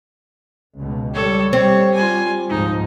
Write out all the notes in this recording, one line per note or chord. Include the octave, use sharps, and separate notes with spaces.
C#2 B2
G3 A4 C#5
G3 C4 C#5
F4 G#5
C#2 G#2 F3 D#4